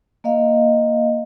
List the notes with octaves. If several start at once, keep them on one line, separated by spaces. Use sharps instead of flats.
A#3 D#5 F5